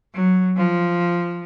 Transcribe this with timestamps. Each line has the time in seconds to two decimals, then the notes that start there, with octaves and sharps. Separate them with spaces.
0.15 F#3
0.57 F3